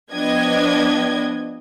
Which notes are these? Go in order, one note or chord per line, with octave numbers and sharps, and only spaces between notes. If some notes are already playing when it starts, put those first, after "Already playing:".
F3 B3 D4 D#5 G5 G#6